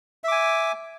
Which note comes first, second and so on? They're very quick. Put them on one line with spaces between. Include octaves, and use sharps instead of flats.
E5 D6 G#5